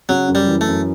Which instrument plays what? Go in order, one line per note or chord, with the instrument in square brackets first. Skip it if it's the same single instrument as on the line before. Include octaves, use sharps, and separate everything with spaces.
[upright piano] C#3 [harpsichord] F#3
[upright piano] F#2
[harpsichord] G3
[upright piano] E3
[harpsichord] A3
[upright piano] F#2